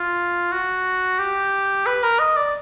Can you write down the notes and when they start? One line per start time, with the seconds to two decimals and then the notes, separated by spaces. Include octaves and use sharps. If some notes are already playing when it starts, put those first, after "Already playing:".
Already playing: F4
0.52 F#4
1.19 G4
1.86 B4
2.03 A#4
2.19 D#5
2.37 D5